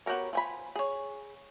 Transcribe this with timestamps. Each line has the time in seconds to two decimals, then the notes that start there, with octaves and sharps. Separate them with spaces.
0.06 B3 F#4 G4 A#4 C#5
0.33 F3 G#5 B5
0.75 G#4 C#5